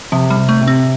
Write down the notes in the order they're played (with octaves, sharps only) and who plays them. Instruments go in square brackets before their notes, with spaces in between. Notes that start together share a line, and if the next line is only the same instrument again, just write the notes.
[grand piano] C3 [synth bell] F3
[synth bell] G3
[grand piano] C3
[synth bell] A3
[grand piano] C3
[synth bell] C4